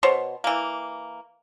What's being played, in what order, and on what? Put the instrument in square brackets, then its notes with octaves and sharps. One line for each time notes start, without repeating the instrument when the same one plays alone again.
[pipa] B2 C5 C#5
E3 A#3